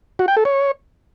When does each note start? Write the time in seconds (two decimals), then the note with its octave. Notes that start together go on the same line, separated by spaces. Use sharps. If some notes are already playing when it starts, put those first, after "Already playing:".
0.19 F#4
0.28 G5
0.37 A4
0.45 C#5